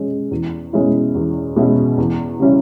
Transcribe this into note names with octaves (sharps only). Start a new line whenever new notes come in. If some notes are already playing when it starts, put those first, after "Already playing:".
Already playing: G#3 C#4
E2
B2 G#3 C#4 E4
E2
B2 G#3 C#4 E4
E2
C#3 G3 C#4 E4